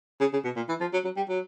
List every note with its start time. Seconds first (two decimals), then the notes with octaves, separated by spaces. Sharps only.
0.21 C#3
0.33 C#3
0.44 B2
0.56 A#2
0.69 E3
0.81 F3
0.93 F#3
1.04 F#3
1.16 G3
1.29 F#3